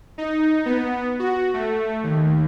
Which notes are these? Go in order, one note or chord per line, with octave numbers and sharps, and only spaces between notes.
D#4
B3
F#4
A3
D#2